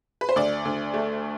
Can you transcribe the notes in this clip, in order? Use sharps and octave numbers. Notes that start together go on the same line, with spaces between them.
B4
C5
D2 D5
D2
A3